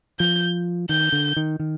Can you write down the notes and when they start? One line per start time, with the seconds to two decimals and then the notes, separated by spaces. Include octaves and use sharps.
0.19 F3 G6
0.89 D#3 G6
1.12 D3
1.37 D#3
1.59 D#3